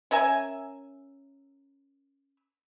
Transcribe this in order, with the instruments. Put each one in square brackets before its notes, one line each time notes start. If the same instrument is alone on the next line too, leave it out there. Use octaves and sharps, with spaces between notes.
[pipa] C#4 A#4 E5 G#5